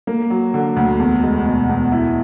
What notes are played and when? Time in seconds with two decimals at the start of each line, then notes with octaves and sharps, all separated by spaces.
0.07 A#3
0.30 F#3
0.54 D3
0.76 D2
0.99 E2
1.23 G#3
1.46 B2
1.69 E2
1.92 E4